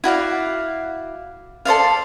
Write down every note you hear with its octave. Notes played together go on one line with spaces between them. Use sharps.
E4 F#4 D5 F5
A4 C5 D5 F5